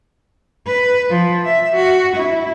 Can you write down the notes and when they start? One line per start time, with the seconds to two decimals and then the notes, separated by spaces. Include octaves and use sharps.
0.67 B4
1.10 F3
1.45 E5
1.76 F#4
2.16 E4